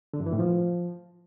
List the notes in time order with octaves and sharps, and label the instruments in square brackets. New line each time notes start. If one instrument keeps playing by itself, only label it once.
[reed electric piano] D3
F#2
E3
A2
F3